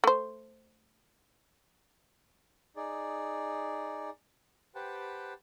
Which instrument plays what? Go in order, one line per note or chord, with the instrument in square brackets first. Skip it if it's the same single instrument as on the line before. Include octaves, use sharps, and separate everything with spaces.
[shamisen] A3 C5
[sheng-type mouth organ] D#4 G#4 D5
G4 B4 C5 F#5 G5 A5